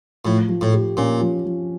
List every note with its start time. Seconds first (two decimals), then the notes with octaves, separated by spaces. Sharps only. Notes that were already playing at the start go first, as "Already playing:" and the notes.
0.25 A2 F3
0.49 F3
0.61 A2
0.74 G4
0.97 A#2 C#4
1.21 F3
1.45 F3